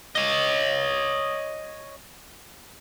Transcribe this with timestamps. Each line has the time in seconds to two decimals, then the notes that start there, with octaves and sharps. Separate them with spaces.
0.16 C#5 D#5